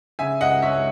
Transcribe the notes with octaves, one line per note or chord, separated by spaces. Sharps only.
C#3 E5 G#5
C#2 D#5 F#5
C#2 C#5 E5